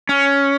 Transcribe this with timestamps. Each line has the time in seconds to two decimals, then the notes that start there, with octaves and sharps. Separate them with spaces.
0.09 C#4